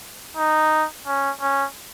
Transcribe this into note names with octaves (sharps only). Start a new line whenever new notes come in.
D#4
C#4
C#4